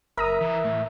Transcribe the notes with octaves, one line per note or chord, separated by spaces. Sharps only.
F#1 A#4 E5 A#5 D#6
E3
A2